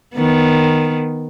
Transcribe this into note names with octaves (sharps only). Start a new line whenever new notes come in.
D#3 B3